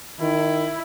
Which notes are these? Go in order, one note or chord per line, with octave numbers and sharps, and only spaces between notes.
D#3 E4